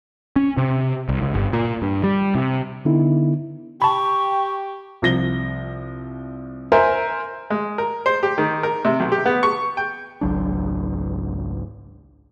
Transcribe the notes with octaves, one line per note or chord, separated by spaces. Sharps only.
C#4
C3
C2
C#2
G1
A#2
G2
G3
C3
D3 B3 D#4 E4
G4 G5 A5 B5 C#6
C2 F3 A#6 G7
A#4 C5 E5 G#5
G#3
A#4
C5
G4
D#3
A#4
C3
B1
G4
B3
C#6
G5
G#1 C#2 F#3 D4